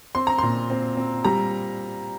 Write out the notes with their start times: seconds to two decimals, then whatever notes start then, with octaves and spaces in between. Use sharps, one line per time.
0.15 C4 C6
0.27 A#5
0.38 A#2 C6
0.70 C4
0.97 C4
1.25 G3 A#5